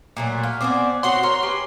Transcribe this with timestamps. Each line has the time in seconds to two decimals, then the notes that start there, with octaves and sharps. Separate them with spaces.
0.17 A#2 F#3 A3
0.43 F5
0.61 B3 C4 C5 D5 G#5
1.03 C4 F#4 C#5 F#5 C6 D#6
1.23 A#4 C#5
1.43 G4 B4 G#5